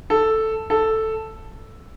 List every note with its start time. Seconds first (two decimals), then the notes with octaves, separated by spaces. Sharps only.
0.10 A4
0.70 A4